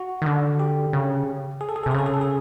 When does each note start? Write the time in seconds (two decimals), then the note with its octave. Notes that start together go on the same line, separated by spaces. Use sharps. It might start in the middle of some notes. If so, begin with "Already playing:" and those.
Already playing: F#4
0.22 D#3
0.26 D3
0.60 G4
0.93 C#3
1.61 G#4
1.69 A4
1.76 G#4
1.83 A4
1.86 C3
1.91 G#4
1.94 C#3 A4
2.06 G#4
2.14 A4
2.21 G#4